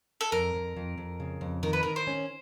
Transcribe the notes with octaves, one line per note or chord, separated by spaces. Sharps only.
A4
F2 A#4
F2
F2
F2
C#3
F2
D#3 A#4
B4
D#3 A#4
C5
C#4